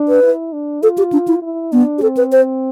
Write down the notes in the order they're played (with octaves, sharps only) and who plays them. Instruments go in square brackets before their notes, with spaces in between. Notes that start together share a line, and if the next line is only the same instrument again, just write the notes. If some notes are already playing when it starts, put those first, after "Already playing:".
Already playing: [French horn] D4
[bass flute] B4
[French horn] E4
D4
[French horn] F4 [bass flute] A4
[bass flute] G4
D4
E4
[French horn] E4
[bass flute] B3 [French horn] D4
[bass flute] G4
[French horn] C4 [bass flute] A4
[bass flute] B4
C5